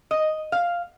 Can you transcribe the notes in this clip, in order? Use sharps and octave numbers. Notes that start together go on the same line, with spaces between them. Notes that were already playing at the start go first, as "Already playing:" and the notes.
D#5
F5